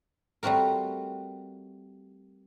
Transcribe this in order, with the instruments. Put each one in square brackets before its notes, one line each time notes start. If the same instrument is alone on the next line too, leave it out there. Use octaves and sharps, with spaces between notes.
[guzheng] G3 A3 C4 F#4 A#4